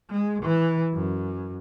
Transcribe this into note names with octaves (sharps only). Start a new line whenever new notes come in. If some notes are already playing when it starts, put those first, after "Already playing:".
G#3
E3
F#2